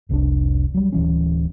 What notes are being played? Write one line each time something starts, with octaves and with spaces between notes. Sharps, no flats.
F1 C2 C3 D4
F#3 G3
D1 E2 E3 C#4